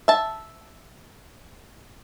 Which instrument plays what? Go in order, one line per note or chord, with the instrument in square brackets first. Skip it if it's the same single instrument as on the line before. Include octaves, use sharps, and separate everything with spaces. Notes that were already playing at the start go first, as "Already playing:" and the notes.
[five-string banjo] E5 A5